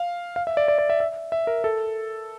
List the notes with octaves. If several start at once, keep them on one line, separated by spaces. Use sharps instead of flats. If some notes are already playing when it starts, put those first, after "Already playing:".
Already playing: F5
F5
E5
D5
D5
D5
E5
E5
E5
A#4
A4